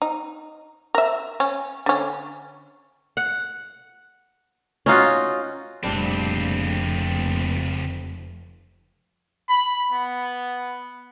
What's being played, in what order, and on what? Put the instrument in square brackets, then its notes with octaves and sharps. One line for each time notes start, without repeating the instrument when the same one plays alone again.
[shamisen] D#4
A#4 E5
C#4
D3 C#4
[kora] F#5
C#4 D#4 F4 F#4
[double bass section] F1 [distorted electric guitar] C#2 C4 [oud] A#2 G3 D4
[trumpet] B5
B3